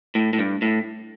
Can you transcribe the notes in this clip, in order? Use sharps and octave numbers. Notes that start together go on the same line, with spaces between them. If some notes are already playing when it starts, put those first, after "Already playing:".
A2
A2
G2
A2